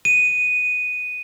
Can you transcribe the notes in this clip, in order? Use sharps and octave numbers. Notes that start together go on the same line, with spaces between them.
D#7